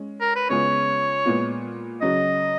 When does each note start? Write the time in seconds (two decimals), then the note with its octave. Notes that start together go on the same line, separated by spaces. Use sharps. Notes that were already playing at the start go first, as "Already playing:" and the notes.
Already playing: G#3 C#4
0.21 A#4
0.36 B4
0.49 C#3 G#3 B3 F4 G#4 C#5
1.25 A#2 G#3 B3 F4
2.01 C#3 F#3 C#4 F#4 D#5